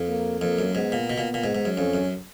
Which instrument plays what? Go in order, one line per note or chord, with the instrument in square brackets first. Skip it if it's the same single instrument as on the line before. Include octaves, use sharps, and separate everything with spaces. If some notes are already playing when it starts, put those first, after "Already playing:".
Already playing: [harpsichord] F2
[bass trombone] A#3
[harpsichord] F2 [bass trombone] A#3
[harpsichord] F#2
[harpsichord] G#2 [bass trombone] B3
[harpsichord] A#2
B2
A#2
A#2
G#2
G#2
F#2
[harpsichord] F2 [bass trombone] C#4
[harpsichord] F#2